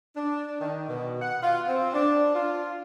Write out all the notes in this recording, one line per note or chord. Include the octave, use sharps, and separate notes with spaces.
D4
D#3
B2
F#5
F4
C4
D4
F4